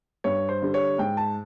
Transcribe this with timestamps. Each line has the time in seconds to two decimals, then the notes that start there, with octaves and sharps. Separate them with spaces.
0.24 G2 C#5
0.49 C5
0.62 D3 G3
0.74 C#5
0.98 G#2 G5
1.17 A5